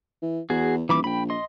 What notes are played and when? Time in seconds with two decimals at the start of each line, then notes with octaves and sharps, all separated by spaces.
0.22 E3
0.50 E2 F#4 G#4
0.89 D#1 E3 B5 D6
1.04 A#1 G5 B5
1.30 D#5 C6